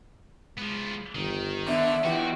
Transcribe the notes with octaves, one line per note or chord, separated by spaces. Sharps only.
F3 G#3 B3
G1 D#3
D3 B3 E5
E3 B3 F#4 G4